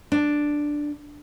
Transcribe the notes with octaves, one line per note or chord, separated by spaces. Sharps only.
D4